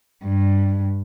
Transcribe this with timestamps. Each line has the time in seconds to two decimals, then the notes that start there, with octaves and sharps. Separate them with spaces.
0.24 G2